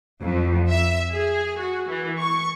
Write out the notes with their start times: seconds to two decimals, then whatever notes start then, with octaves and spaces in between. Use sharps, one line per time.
0.22 F2
0.70 E5
1.13 G#4
1.59 F#4
1.89 E3
2.19 C#6